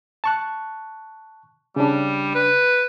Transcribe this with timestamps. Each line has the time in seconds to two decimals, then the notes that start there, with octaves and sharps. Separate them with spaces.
0.24 A5 C#6 F#6
1.76 C#3 G3 D4
2.34 B4